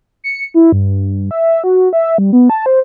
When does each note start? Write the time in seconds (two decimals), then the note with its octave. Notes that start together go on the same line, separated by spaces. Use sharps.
0.24 C#7
0.54 E4
0.72 G2
1.31 E5
1.64 F#4
1.93 E5
2.18 G3
2.33 B3
2.50 A5
2.66 C5